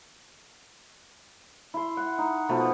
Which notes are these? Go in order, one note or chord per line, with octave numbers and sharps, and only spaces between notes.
E4 C6
F#5
D#4
B2 F3 A3 B3